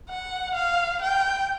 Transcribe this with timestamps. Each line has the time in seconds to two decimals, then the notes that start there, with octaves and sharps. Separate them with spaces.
0.09 F#5
0.55 F5
1.02 G5